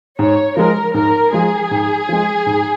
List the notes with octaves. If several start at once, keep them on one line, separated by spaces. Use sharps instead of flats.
G#2 C#5
F3 G#3 A#4
G#2 A#4
F3 G#3 G#4
G#2
F3 G#3
G#2